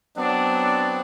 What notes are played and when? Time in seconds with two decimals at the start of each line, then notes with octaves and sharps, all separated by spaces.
0.16 F#3 B3 C4 D4